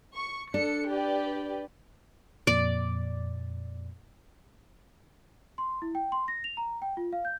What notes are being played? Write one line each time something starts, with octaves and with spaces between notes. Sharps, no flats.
C#6
D4 A4 C#7
G4 B4 D5
F2 A#2 D5
C6
E4
G5
C6
A#6
F7
A#5
G5
F4
F5
G6